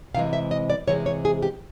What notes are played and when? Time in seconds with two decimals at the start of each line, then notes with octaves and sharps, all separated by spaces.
0.14 C3 E3 G#3 F5
0.33 E5
0.51 D#5
0.70 D5
0.87 C3 E3 G#3 C#5
1.06 C#5
1.25 G#4
1.42 G4